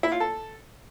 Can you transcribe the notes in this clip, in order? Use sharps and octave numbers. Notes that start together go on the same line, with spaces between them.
E4
F4
A4